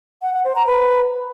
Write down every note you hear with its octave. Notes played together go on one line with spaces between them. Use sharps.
F#5
F#5
C5
A#5
B4